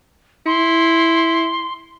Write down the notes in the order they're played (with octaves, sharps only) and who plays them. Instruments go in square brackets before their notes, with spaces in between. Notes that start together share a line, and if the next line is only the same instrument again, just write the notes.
[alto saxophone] E4 [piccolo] C6